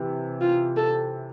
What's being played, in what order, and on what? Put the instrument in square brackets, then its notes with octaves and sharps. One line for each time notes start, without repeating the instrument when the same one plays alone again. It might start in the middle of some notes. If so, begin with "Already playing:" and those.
Already playing: [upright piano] C3 E3
[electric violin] F4
A4